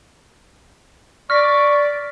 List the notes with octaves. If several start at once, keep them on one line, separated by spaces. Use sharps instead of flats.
D5 C#6 F6 A#6 B6